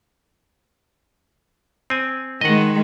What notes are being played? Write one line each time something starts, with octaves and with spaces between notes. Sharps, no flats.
C4 G#5
D#3 G#3 D#5 F#5